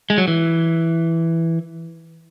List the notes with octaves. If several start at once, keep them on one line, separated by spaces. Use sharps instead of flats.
G#3
F#3
E3